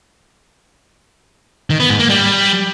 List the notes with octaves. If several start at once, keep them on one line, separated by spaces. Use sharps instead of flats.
D#3
B3
G#2
A#3
G3